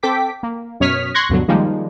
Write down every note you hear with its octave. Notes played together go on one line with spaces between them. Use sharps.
C4 A4 G5 D6 B6
A#3
F#2 B2 C#5 D#6 F6 B6
C6 C#6 F#6 G#6 A#6
D2 G2 B2 D3 F#3
D#3 F3 G3 G#3 A#3 D#4